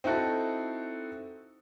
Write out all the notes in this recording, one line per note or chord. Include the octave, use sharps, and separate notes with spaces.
C4 D#4 E4 F#4 A4